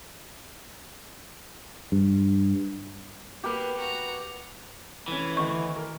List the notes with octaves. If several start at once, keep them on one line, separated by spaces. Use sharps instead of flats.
G2
A#3 B3 G4 B4
F#4 A#5
F1 E3 C#4
D2 D#3 B3 C#6
A#4